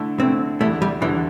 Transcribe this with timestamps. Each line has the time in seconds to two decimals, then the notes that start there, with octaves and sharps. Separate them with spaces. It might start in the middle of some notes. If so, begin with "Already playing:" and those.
Already playing: D3 A3 E4
0.20 D3 A3 C4 E4
0.60 E2 D3 G3 A3 E4
0.82 G3
1.01 E2 D3 E3 G3 E4